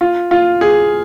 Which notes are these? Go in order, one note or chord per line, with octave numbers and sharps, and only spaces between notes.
F4
F4
G#4